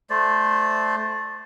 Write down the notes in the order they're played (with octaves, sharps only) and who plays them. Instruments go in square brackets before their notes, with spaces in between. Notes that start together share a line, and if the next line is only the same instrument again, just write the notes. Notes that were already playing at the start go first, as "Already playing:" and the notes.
[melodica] A3 C5 D5